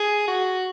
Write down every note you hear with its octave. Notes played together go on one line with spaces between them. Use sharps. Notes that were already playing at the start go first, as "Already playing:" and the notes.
Already playing: G#4
F#4